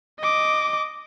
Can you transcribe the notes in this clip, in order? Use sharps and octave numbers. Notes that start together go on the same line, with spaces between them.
D#5 D6